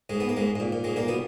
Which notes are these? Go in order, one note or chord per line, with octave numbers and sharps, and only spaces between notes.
G#2 G#3
B3
A#3
G#2 G#3
G#2
A#2
A#2
G#2 G#3
A#2 A#3
B2 B3